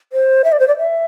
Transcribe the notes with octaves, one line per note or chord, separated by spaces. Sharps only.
C5
E5
D5
C5
D5
E5